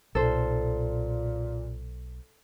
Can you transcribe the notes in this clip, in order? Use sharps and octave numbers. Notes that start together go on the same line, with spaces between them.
B1 A#2 A4 C5